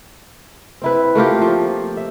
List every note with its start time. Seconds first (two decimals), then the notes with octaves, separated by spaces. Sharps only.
0.82 C4 E4 B4
1.15 A3 A#3 F4 G4
1.42 F3
1.97 E5